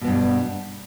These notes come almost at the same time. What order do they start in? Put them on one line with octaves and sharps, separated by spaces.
B2 B3 G2